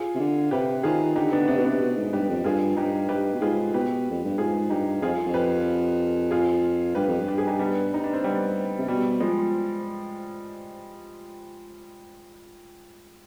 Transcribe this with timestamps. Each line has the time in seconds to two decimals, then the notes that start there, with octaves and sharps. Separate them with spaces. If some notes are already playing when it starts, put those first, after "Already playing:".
Already playing: F4 G#4
0.15 C3
0.19 D3
0.51 C3 G4 B4
0.83 D#3 F4 G#4
1.16 D3 D#4 G4
1.32 B3 D4
1.48 C3 B3 D4
1.57 B2
1.64 C3 B3 D4
1.80 B2
1.97 G#2
2.13 G2 G4 B4
2.29 F2
2.44 G2 F4 G#4
2.77 G2 D#4 G4
3.09 G2 G4 B4
3.34 B2
3.41 G#2 F4 G#4
3.74 B2 G4 B4
4.10 F2
4.24 G2
4.38 G#2 F4 G#4
4.70 G2 D#4 G4
5.02 F2 F4 G#4
5.26 F2
5.34 G4 B4
6.31 F4 G#4
6.95 G2 G4 B4
7.08 F2
7.21 G2
7.28 G4
7.38 G#4
7.47 D#4 G4
7.59 G3 B3
7.94 D#4
8.04 D4
8.13 C4
8.24 G3 B3
8.78 C3
8.88 B2 G3
9.20 F3 G#3